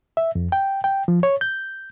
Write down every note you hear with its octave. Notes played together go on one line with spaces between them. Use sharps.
E5
F2
G5
G5
F3
C#5
G6